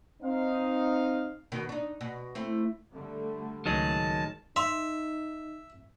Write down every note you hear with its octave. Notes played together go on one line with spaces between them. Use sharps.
C4 D#4 F5
B2 D#3
D4 D#4
B2
A3 C4 E4
D3 G3 A3
C#2 A2 D#3 F#3 G#3 A5
D#4 E5 C6